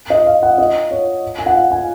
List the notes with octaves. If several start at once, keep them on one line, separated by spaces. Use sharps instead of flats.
D#5
F5
F#5
D#5
C#5
G#5
F#5
F5
G#5